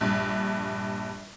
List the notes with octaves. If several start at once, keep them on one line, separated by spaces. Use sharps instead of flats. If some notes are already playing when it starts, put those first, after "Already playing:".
A#1 G2